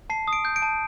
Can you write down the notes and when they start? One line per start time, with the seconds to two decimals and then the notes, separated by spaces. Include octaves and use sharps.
0.10 A5 C7
0.28 D#6
0.33 D7
0.45 G6
0.56 D7
0.62 A5